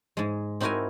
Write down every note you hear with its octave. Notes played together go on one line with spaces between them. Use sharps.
G#2 G#3
C4 D#4 E4 F#4 A#4 G#5